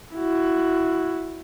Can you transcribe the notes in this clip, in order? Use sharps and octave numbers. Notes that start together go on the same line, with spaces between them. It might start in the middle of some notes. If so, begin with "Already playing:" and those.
E4 F#4